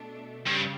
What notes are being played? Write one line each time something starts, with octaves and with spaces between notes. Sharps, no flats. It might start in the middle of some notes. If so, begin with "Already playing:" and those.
Already playing: B2 A3 D4
G2 C#3 G3